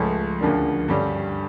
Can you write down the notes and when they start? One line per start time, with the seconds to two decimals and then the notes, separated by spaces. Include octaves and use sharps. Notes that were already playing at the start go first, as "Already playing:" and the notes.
Already playing: C#2 C#3 F3 A3 C#4
0.41 D2 C#3 F3 A#3 D4
0.88 G2 D3 G3 C#4 G4